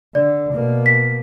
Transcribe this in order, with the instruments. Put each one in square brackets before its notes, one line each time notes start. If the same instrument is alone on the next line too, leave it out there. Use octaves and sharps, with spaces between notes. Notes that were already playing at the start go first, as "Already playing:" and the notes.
[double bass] D3 [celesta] D5
[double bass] B2 A#3
[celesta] B6